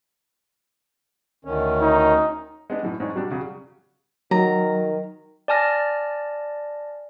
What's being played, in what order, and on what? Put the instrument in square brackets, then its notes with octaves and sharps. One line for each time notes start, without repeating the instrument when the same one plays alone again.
[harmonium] D2 D#3 C#4
[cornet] D#4
[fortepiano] G#3 B3 D4
F#2 A2 E3
G#2 G#3 C#4 D4
B2 F#3 G3 D4
C#3 F#3 G3
[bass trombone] D#3 [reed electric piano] F#3 [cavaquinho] A#5
[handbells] D5 G#5 A5 F6 A#6